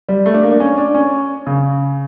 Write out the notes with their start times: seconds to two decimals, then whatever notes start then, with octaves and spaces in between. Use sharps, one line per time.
0.09 G3
0.26 A3
0.34 D4
0.43 A#3
0.52 D4
0.60 C#4
0.78 D4
0.95 C#4
1.47 C#3